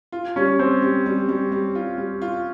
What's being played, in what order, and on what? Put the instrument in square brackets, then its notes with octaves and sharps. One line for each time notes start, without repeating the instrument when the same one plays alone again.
[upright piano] F4
[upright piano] G3 [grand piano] C#4
[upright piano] G3 [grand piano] C4
[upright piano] G3
G3
G3
G3
F4
G3
F4